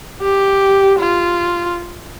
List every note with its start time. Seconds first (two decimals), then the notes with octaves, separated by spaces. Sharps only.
0.23 G4
0.99 F4